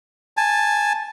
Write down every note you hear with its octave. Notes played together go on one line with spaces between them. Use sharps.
G#5 A5